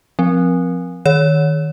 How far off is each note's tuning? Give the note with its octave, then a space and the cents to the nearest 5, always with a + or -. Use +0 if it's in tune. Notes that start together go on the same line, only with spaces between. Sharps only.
F3 +5 C4 +0
D#3 +0 C#5 +15